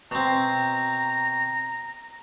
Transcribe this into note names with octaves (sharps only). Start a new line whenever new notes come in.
B2 C4 A#5